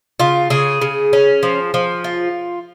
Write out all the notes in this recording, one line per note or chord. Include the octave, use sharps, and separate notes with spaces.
C#3 F4
C#3 G#4
C#3
C#4
F3
F3
F4